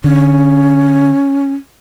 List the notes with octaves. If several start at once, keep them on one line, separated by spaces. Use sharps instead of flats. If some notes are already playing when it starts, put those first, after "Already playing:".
D3 C#4